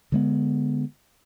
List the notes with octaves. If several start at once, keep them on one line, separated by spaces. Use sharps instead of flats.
D3 G#3 B3